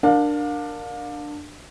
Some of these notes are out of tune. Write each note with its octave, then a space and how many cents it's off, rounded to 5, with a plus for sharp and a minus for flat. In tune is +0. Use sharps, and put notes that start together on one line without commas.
D4 +15 A#4 -5 F5 +35